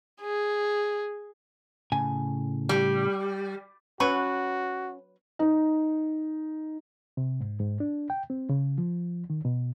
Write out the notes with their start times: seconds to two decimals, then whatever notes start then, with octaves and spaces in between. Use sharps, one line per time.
0.21 G#4
1.92 A2 C#3 G#5
2.69 G3
4.00 F#3 C#4 F#4 B4 C#6
5.39 D#4
7.17 C3
7.41 G#2
7.60 G#2
7.80 D4
8.10 G5
8.30 C4
8.49 C#3
8.78 F3
9.30 D#3
9.45 B2